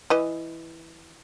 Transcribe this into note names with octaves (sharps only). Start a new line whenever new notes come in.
E3 D#5